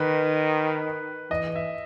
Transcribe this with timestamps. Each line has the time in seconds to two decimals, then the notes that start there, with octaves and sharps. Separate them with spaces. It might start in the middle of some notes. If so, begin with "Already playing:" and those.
Already playing: D#3 B4
1.30 E3 D#5
1.56 E5